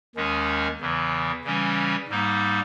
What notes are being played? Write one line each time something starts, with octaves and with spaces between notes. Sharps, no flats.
D#2 D#3 G#3 C#4
E2 C#3 E3
C#3 E3 G3 C#4
G#2 G3 A#3 D#4